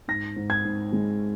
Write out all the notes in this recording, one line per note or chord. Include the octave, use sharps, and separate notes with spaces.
G#2 A#6
G#2
G#6
G#2
G#3